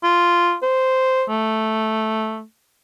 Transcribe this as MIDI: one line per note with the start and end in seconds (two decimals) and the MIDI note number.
0.04 0.56 65
0.63 1.23 72
1.30 2.43 57